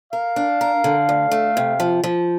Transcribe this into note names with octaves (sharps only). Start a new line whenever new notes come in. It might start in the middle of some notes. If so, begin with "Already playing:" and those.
A#4 F5
D4
A#4
D3
D2
A3
C3
F3
F3